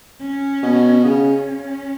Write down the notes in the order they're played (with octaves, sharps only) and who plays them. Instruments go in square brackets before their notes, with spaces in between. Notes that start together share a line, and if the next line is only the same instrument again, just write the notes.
[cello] C#4
[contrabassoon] B2
[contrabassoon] C#3 [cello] C#4